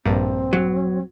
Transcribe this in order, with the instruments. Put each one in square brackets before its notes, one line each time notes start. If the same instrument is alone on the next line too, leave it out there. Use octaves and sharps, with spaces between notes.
[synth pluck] A#1 G2 [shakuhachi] C4
[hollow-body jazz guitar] F#3